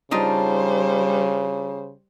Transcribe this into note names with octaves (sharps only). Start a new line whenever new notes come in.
C#3 G3 D4 D#4 F4 C5